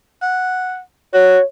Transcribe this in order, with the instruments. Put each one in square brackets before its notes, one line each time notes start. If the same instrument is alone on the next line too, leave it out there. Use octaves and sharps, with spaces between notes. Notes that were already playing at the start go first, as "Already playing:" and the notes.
[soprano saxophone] F#5
[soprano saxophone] F#4 [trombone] C#5